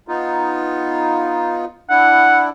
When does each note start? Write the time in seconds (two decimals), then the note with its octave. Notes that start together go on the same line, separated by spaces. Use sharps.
0.08 B3 D#4 F4
1.90 D4 E4 F#5